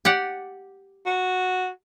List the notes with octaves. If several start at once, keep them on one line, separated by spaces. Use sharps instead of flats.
G4 D5 F#5
F#4